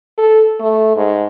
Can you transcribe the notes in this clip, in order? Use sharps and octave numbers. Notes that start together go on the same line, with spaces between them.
A4
A3
G#2